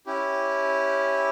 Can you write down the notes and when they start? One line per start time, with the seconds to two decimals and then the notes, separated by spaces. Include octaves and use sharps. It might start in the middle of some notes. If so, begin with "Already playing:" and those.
0.06 C#4 E4 G4